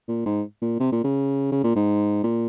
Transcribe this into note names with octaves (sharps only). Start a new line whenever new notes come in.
A#2
G#2
A#2
C3
A#2
C#3
C#3
A#2
G#2
A#2